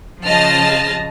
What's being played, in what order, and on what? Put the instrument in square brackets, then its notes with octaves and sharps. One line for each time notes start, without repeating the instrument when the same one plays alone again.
[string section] C#3 F3 D#5 A5 F6